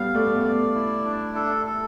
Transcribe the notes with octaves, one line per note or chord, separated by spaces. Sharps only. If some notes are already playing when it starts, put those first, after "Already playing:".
Already playing: G3 B3 F5
A3 D5
B3
A3
D5
E4
D4
A4
A4